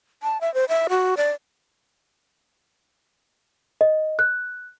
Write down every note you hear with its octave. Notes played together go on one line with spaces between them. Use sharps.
A5
E5
C5
E5
F#4
D5
D#5
F#6